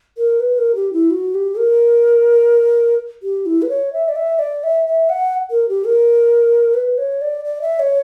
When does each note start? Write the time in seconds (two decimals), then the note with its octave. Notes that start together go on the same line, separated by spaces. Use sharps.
0.17 A#4
0.40 B4
0.58 A#4
0.75 G4
0.93 E4
1.10 F#4
1.35 G4
1.58 A#4
3.23 G4
3.46 E4
3.62 B4
3.69 C#5
3.93 E5
4.09 D5
4.16 E5
4.39 D5
4.64 E5
4.87 E5
5.09 F#5
5.51 A#4
5.69 G4
5.86 A#4
6.74 B4
6.98 C#5
7.21 D5
7.45 D5
7.62 E5
7.80 C#5